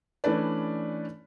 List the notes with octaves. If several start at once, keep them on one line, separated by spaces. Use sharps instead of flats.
E3 A3 C#4 D4 B4 D5